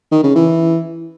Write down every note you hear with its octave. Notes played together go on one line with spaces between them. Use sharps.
D#3
C#3
E3